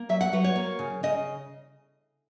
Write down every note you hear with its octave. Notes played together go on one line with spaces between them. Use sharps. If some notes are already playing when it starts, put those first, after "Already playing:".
Already playing: A#3
F#3 E5
F#5
F#3 B4
C#5
A#3
C#3
C#3 D#5